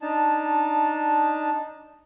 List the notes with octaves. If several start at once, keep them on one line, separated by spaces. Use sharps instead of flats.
D4 D#4 A5